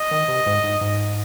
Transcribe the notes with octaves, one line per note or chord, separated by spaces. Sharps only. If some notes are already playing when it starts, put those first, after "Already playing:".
Already playing: D#5
D#3
C3
G#2
G#2
G#2